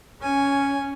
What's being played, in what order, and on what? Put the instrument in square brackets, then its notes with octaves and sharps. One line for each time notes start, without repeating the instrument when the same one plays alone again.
[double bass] C#4 [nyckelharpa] G#5